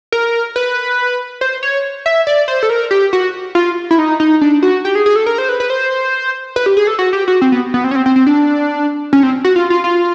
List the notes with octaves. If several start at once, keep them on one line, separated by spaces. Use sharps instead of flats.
A#4
B4
C5
C#5
E5
D5
C5
A4
A#4
G4
F#4
F4
E4
D#4
D#4
D4
F#4
G4
G#4
G#4
A4
A#4
C5
B4
B4
C5
B4
G4
G#4
A4
F#4
G4
F#4
C4
B3
B3
C4
C#4
C4
C4
C4
D4
C#4
C4
F#4
F4
F4
F4